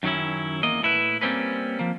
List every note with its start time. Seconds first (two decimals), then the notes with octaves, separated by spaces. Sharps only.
0.03 F#2 D#3 F#3 C#4 E4
0.63 E2 A#3 D#5
0.83 A2 E4 B4
1.21 G3 A#3 C4 C#4 B4
1.79 F3 A#3